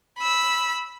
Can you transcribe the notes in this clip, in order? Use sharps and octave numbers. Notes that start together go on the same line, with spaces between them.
B5 E6